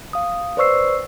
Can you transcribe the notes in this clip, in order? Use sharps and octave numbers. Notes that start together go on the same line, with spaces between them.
F5 D#6
B4 C5 D5 C#6 E6 C7